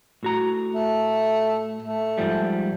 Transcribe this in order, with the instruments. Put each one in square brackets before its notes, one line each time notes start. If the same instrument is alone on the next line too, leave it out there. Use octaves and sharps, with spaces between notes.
[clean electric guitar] A2 F#4 A#5
[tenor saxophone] A3
A3
[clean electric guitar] G#2 F3 G3